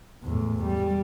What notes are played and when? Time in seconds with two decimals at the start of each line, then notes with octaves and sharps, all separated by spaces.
0.23 E2 A2
0.64 G3